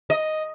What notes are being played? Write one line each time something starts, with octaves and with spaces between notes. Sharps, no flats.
D#5